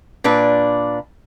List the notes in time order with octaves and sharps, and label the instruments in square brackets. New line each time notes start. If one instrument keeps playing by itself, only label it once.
[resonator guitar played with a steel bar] A#2 D4 B4